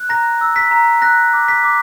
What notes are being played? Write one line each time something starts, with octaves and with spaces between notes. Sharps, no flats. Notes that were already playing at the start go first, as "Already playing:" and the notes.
Already playing: F#6
A#5 A#6
E6
B6
A#5
F#6 A#6
D6
B6
D6